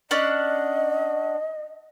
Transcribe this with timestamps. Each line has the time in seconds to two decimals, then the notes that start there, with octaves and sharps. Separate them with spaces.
0.11 C#4 D4 D#5 F#5